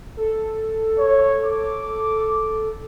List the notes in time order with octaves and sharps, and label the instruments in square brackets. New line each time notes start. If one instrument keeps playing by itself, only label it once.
[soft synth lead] A4
[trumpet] C#5
D6